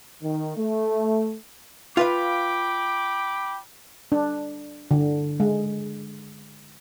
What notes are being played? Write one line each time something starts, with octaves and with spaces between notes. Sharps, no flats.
D#3
A3
F4 B4 F5 G5 B5 D6
D4
D3
G#3